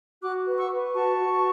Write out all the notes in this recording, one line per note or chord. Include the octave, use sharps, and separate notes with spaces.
F#4 D6 F#6
B4
C#6 E6
B4
F#4 A5 C#6
F#4